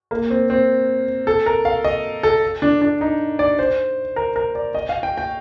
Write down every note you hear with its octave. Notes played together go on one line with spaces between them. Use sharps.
A#3
C4
C4
A4
A#4
F5
D#5
A4
D4
D4
D#4
D5
C5
A#4
A#4
D5
D#5
F5
G5
G5